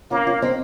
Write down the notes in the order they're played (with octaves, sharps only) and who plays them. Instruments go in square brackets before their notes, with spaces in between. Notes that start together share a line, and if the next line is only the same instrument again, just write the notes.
[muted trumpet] A#3 [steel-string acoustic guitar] C#4 F4
[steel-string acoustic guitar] C#4 F4
C4 D#4